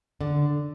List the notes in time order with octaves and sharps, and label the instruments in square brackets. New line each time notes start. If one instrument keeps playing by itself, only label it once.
[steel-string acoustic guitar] D3